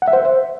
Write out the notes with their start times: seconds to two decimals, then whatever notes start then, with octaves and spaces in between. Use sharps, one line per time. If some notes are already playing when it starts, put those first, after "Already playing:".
0.02 F#5
0.08 E5
0.13 C5